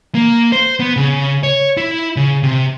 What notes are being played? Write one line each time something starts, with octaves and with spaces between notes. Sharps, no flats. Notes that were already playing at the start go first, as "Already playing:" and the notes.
A#3
C5
B3
C#3
C#5
E4
C#3
C3